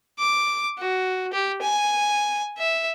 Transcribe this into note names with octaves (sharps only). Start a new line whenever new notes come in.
D6
F#4
G4
G#5
E5